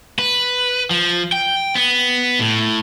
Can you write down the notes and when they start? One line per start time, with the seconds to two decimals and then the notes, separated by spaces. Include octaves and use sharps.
0.19 B4
0.91 F3
1.32 G5
1.75 B3
2.40 A2